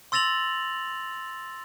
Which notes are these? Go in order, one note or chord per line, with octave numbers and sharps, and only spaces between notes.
C6 E6 A6 A#6 F7 F#7